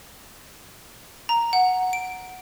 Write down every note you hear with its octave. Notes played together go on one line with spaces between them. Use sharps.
A#5
F#5
D7